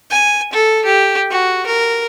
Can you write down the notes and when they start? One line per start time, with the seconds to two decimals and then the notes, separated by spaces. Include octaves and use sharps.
0.11 G#5
0.53 A4
0.85 G4
1.31 F#4
1.67 A#4